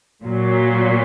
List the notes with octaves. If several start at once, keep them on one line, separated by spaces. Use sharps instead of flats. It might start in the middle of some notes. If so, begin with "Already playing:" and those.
A#2 F#3